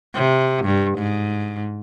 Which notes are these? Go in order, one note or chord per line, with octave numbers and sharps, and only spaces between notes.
C3
G2
G#2